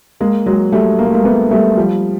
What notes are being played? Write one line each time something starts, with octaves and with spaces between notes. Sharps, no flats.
G#3 A#3
F#3 G#3
G3 A3
A#3
A3
G#3 A#3
A3 B3
G3 A3
F3 G3